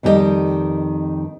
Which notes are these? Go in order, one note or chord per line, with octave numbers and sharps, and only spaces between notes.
F2 D#3 G3 D4 G4 D#5